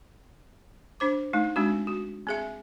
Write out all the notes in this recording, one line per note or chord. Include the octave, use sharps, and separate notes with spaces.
D4 C5 D6
A3 D#4
G#3 C4 D4 F#4
F#4
C4 G#4 E5